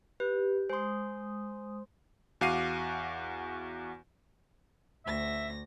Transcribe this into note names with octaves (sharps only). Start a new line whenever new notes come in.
G4 B4
G#3 C5 C6 D#6
E2 F#4 F5 D6 C7 D#7
D2 E5 A#6